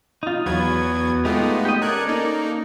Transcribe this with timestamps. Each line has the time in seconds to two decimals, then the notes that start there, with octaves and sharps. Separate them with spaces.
0.23 D#4 F4
0.46 E2 F#3 B3 B4 G#6
1.25 G#3 A3 B3 D#4 F4 G4
1.65 G4 D#5
1.82 C#4 A4 A#4 D5 F#6 G#6
2.07 A#3 D#4